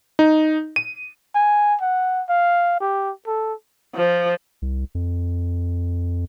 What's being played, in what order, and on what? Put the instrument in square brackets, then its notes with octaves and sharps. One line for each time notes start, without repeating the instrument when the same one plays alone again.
[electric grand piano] D#4
D#7
[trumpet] G#5
F#5
F5
G4
A4
[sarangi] F3
[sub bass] C2
F2